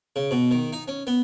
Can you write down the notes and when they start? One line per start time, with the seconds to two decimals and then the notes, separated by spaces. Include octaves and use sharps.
0.16 C#3
0.31 B2
0.51 D#3
0.72 D#4
0.88 C#4
1.07 B3